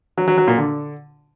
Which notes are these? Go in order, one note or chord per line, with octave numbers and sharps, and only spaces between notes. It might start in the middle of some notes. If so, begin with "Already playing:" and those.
F#3
F#3
F#3
A#2
D3